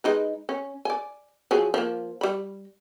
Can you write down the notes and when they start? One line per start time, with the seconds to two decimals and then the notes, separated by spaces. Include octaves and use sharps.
0.04 G#3 D#4 B4
0.49 C#4
0.85 D5 G#5
1.51 F3 F#3 G#4
1.74 F3 A#3
2.21 G3 B5